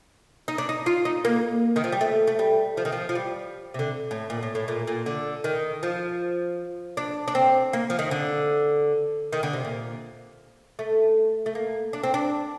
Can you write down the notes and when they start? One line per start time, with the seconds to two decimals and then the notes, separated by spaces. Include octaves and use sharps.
0.48 D#4
0.58 D4
0.69 D#4
0.86 F4
1.05 D#4
1.25 A#3
1.76 D#3
1.84 F3
1.92 G3
2.01 A3
2.27 A3
2.39 G3
2.77 F3
2.85 D#3
2.92 F3
3.09 F3
3.15 G3
3.74 C3
3.79 D3
4.11 A2
4.30 A#2
4.43 A2
4.55 A2
4.68 A#2
4.87 A#2
5.06 D3
5.44 D#3
5.83 F3
6.97 D4
7.28 D4
7.35 C4
7.73 A#3
7.90 F3
7.99 D#3
8.11 D3
9.33 D#3
9.43 D3
9.53 C3
9.65 A#2
10.79 A3
11.46 A3
11.55 A#3
11.93 D4
12.03 C4
12.14 D4